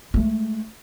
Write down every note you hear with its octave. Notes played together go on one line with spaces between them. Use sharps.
G#3 A3